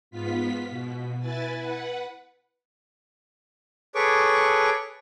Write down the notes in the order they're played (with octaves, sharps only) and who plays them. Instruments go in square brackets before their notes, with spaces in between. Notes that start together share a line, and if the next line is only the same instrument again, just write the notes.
[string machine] G#2 B3 F4 B6
B2
E4 B4 G#5 A6
B4 F#5
[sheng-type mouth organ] G#4 A4 B4 C#5 C#6 D6